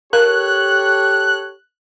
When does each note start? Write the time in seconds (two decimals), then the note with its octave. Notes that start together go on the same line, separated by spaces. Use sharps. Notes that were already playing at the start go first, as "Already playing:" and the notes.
0.13 G4 A4 A#4 C#5 F#6